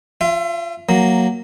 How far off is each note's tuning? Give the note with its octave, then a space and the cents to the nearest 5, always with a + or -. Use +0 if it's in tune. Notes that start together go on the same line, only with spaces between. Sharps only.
F4 +0 E5 +40
F#3 +0 A#3 +0